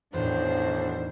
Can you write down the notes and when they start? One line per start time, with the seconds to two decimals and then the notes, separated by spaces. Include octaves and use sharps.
0.14 B1 E2 A2 D#3 D4 C5